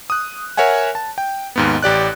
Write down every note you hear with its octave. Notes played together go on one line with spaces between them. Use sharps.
D#6 F#6
A#4 C#5 E5 F#5 G#5
A5
G5
D#2 G#2 B3
A1 G4 D5 F#6